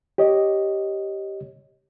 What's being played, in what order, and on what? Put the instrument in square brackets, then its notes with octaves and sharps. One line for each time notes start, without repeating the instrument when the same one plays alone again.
[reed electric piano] G4 C#5 D#5